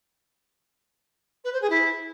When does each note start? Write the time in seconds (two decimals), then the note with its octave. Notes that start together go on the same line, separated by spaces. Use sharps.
1.44 B4
1.53 C5
1.61 G#4
1.69 E4